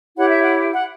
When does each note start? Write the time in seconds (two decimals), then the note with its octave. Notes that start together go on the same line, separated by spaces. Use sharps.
0.16 E4 G4 C#5 F#5
0.29 E5
0.41 F#5
0.73 F#5